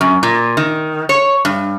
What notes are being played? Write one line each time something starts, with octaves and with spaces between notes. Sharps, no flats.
F#2
A#2
D#3
C#5
G2